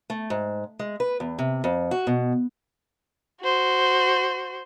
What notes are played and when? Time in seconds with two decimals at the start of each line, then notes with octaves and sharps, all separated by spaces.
0.10 A3
0.30 G#2
0.79 G#3
1.00 B4
1.20 E2
1.39 C3
1.64 F2
1.91 F#4
2.07 B2
3.42 F#4 C5